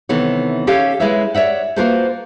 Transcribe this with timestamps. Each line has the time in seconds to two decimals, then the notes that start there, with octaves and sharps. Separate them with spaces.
0.09 C3 D#3 E3 B3 A4 C#5
0.67 C#4 G4 A4 C#5 F5
1.00 G#3 E4 B4 C#5 E5
1.35 C#5 D5 E5 F#5
1.76 A#3 F4 F#4 A4 B4 C5